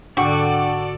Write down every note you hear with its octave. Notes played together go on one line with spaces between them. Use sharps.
G#2 D3 D4 F#4 A4 D5 G5 D6